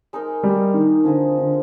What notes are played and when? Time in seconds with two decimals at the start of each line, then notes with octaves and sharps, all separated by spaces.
0.13 G#3 D#4 A#4
0.43 G3
0.74 D#3
1.04 D3 F3 C4 F4 G#4
1.38 D3